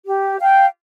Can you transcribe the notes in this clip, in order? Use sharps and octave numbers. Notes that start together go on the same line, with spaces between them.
G4
F5 G5